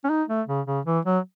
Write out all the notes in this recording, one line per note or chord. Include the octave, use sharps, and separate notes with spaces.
C#4
D#4
A3
C#3
C#3
E3
F#3